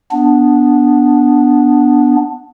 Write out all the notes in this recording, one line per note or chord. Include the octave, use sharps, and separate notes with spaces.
B3 D4